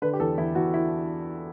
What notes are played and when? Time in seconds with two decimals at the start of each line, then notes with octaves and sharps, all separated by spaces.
0.02 D3 B4
0.13 G4
0.20 E2 A4
0.38 E2 E4
0.55 E2 F#4
0.74 E4